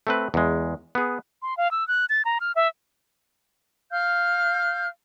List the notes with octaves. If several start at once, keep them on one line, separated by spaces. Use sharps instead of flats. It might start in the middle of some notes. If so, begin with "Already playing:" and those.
A3 C4 B4
E2 G#3
B3 G#4
C6
F5
E6
F#6
A6
A#5
F6
E5
F5 F6 G6